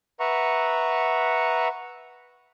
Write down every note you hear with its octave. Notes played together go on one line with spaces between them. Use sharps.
B4 E5 F#5 A#5 C#6